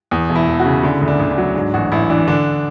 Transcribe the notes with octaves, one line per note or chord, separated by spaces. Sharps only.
E2
E1
E4
E1
F#4
C#3
D3 E4
D2
D4
D2
D4
F#3
G#2 D4
A1 F#4
A1 E4
E3 D4
D3 D4